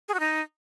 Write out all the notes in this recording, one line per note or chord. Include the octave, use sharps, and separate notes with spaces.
G#4
F#4
D#4